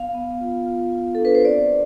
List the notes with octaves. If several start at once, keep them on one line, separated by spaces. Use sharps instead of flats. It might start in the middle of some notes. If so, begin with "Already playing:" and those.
Already playing: B3 F5
B3
F4
F4
F4
D4 A4
B4
C5
C4 D5